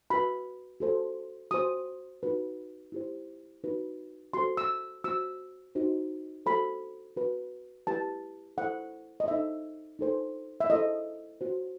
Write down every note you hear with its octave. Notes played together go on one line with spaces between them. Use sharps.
F#4 B4 B5
F#4 A4 C5
F#4 C5 D#6
D#4 F#4 B4
E4 G4 C5
D#4 F#4 B4
F#4 A4 C5 C6
E6
F#4 C5 E6
D#4 F#4 C5
F#4 A4 C5 B5
F#4 B4
E4 G4 B4 A5
E4 A4 C5 F#5
D#5
D#4 A4 C5 E5
D#4 A4 C5
E5
E4 A4 C5 D#5
F#4 C5